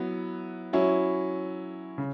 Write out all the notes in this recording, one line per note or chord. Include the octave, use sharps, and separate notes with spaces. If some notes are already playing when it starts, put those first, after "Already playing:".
Already playing: F#3 B3 E4
F#3 C#4 E4
C#3